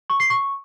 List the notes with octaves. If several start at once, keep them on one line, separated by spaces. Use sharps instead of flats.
C#6
C7
C#6